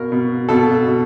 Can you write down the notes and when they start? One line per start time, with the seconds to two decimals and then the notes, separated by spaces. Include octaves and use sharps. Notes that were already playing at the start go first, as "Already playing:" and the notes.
Already playing: B2 A#4
0.12 B2
0.49 B2 A4
0.86 B2